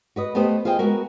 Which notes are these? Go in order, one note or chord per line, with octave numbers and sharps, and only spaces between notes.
F#4 B4 D#5
A3 B3 G4 C5 D#5
F4 G#4 C5 D#5 G5
G#3 B3 F#4 A#4